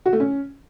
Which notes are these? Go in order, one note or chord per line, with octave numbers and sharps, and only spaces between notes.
F#4
A3
C#4